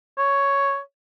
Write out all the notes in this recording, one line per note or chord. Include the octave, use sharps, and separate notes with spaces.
C#5